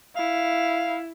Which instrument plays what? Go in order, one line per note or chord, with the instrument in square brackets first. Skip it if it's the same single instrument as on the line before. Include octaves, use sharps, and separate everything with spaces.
[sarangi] E4 [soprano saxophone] F5